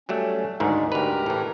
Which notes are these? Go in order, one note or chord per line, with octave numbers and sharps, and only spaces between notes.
F#3 G3 A3 C#4
D2 G#2 D#3 G#3 D5
D2 G4 A#4 B4 A#5
A2 E3